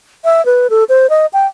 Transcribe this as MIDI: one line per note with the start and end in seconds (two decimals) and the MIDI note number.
0.25 0.44 76
0.46 0.67 71
0.70 0.84 69
0.89 1.09 72
1.10 1.26 75
1.33 1.46 79